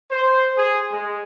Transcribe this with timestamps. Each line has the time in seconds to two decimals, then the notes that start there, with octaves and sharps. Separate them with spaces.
0.10 C5
0.57 G#4
0.92 G#3